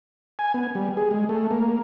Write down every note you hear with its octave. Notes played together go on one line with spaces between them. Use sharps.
G#5
B3
G3
G#4
G#3
A3
A#3